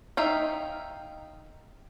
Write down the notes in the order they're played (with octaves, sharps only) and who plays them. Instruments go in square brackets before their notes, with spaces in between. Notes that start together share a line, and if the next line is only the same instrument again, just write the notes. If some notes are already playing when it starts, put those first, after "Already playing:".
[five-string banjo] D#4 E5 F5 G5